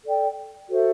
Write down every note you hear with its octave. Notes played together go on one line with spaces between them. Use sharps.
A4 D5 G5
F#4 A4 C5 E5